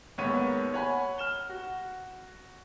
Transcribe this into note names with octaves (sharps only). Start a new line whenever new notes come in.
D#2 G#2 B3 C#5 C#6 D#7
C#5 F#5 G#5 B5 C#6
F6 E7 G7
F#4